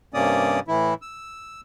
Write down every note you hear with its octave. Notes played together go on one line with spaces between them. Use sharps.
G2 C3 A#3 C#4 D5 D#6
A2 E3 E4
E6